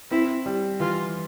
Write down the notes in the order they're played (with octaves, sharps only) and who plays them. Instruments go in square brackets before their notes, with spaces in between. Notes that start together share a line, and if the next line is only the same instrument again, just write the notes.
[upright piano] C4 [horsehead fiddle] E4
[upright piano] G3
[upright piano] E3 [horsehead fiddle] F4